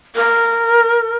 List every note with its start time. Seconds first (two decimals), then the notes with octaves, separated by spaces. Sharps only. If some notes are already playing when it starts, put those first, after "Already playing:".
0.15 A#4